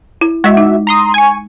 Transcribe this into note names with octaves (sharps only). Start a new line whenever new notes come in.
E4
G#3 F#4 D#5 E5
D#4
A#5 C6 D#6
G#5 C#6